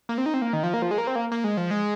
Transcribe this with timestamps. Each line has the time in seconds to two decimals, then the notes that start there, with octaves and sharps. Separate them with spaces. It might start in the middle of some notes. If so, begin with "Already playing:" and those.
0.09 A#3
0.18 C4
0.26 D#4
0.34 C4
0.42 A#3
0.53 D#3
0.63 F3
0.74 A#3
0.82 F3
0.91 G#3
0.98 A#3
1.07 C4
1.16 A#3
1.32 A#3
1.44 G#3
1.57 F3
1.71 G#3